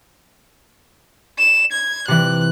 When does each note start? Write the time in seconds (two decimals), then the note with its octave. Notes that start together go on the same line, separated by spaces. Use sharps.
1.38 E7
1.72 G#6
2.08 C3 E3 F#6